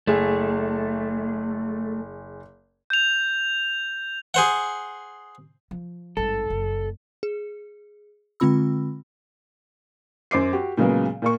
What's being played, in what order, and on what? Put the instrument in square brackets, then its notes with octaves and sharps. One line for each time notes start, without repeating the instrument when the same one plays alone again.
[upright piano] F#1 G#4 [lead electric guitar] A3
[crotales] G6 F7
[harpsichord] G#4 C5 F#5
[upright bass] F3
[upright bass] G#1 G2 [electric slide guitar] A4
[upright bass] F#1
[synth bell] G#4
D3 G#3 C4 F4 B5 E6
[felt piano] F#2 C5 D6 C7
F#4 G4
A#2 C#3 F#3 G#3 B3
A#2 A#3 C#6